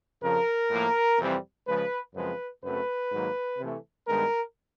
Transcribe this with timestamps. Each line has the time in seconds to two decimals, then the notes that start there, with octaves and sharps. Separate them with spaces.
0.22 F2 C#3 F3 A#4
0.71 A2 F3 A#3
1.19 F2 C3 E3 G3 C4
1.66 C#3 F3 G#3 B4
2.14 F#2 C#3 F3 G#3 C4 B4
2.63 F#2 C#3 F#3 A3 C4 B4
3.12 G#2 D#3 F#3 A#3
3.59 C3 E3 A3
4.07 G2 D#3 G#3 B3 A#4